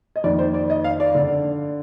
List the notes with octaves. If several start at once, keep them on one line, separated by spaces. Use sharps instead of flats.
D#5
F2 D#3 A#3 D5
C5
D5
D#5
F5
D5
D3